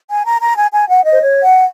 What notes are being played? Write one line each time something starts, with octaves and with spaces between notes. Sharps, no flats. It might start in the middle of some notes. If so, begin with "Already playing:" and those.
G#5
A#5
A#5
G#5
G#5
F#5
D#5
C5
C#5
F#5